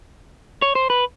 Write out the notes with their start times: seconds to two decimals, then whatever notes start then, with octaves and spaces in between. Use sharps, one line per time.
0.62 C#5
0.75 C5
0.90 B4